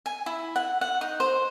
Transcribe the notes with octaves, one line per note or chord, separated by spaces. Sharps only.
G#5
E4
F#5
F#5
D#4
C5